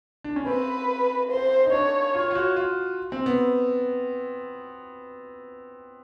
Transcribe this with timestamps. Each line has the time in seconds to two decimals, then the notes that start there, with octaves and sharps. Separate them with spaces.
0.24 D4
0.36 C#4
0.47 C4 B4
1.31 C5
1.66 D#4
1.72 D4 C#5
2.15 F4
2.31 F4
2.35 F#4
2.56 F4
3.12 C4
3.26 B3